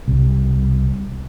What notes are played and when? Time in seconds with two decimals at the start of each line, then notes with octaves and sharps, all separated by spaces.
0.08 C2